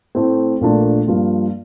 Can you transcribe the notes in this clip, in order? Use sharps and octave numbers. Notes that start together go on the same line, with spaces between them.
A2 A3 C4
A#1 A#2 A3 D4
G2 F3 A#3 F4